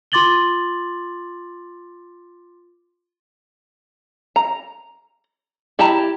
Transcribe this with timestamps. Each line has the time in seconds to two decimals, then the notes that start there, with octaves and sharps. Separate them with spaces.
0.12 F4 C6 D6 A6 F#7 G7
4.36 A#5
5.79 E4 G4 G5 A5 A#5